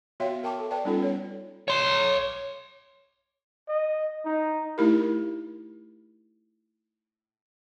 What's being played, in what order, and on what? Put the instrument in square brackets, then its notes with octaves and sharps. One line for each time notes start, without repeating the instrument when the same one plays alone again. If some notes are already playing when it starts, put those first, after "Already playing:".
[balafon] B3 F#4 C#5 E5 F5 G5
A#4 G5 A5 C#6 D6
A4
B4 D5 G5 A5
G3 B3 C#4 D#4 F4 A4
C#5
[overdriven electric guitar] C#5 C6
[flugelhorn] D#5
D#4
[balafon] A3 D#4 E4 G4 A#4